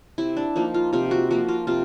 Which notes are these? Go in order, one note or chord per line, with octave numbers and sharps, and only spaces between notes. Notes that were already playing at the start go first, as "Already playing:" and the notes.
C3 E4
D4
F3 A#3 D#4
F4
C3 F4
F#4
F3 A#3 F#4
F4
C3 F4